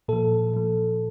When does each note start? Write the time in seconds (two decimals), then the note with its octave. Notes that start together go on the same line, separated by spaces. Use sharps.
0.08 A#2 F3 A4
0.54 A#2 F3